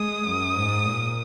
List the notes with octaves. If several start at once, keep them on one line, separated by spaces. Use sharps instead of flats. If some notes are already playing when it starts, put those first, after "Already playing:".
Already playing: G#3 D#6
F#2
G#2
A#2